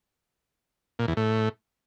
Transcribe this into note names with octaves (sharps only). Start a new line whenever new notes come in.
A#2
E2
A2